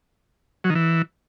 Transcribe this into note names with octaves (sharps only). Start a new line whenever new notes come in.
F#3
D#3
E3